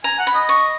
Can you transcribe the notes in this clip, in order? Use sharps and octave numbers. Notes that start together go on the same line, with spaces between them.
G#5 A#5
F#5
B5
D#5
C#6